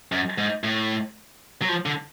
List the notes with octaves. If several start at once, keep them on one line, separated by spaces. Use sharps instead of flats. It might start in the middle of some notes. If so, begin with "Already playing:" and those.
F#2
G#2
A2
F#3
F3
D3